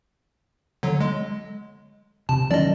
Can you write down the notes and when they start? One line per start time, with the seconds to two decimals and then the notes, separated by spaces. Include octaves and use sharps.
0.83 D3 F#3
1.01 G#3
2.29 C3 A5
2.51 D#3 F#3 C#4 D5 D#5